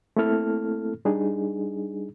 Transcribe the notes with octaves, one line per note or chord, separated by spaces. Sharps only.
A3 A#3 C4 E4 A4 F6
G3 D4 D#4 G#4